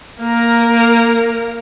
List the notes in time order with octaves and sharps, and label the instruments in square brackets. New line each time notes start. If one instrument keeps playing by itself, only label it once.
[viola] A#3 A#4